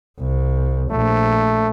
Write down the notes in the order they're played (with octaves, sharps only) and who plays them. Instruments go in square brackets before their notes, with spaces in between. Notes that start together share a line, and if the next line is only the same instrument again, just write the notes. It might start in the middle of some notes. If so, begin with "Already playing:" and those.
[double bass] C2
[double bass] A#1 [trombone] A3